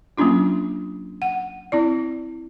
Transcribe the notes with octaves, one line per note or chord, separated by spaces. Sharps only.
F#3 A#3 C#4 D4 F4
F#5
C4 E4 D5